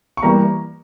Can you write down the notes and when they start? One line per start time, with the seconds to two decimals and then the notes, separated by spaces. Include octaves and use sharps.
0.17 C#6
0.23 E3 G3 A#3 A#5